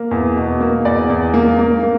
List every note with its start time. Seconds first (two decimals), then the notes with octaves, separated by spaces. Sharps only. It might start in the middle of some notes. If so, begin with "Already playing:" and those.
Already playing: A#3
0.11 E2
0.36 B2
0.60 A#3
0.85 E2 D5
1.09 E2
1.34 A#3
1.59 A#3
1.83 A#3